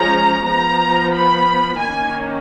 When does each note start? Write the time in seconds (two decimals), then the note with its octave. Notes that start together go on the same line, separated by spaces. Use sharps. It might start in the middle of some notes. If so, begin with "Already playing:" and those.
Already playing: F3 G#3 C#4 A#5
0.47 F3 B3 A#5
1.14 B5
1.79 D#3 A#3 C#4 G#5